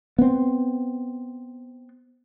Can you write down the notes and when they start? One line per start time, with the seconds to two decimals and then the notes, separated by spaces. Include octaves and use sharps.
0.18 B3 C4